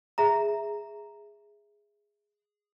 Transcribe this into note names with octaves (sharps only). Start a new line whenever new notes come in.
G#4 E5 A#5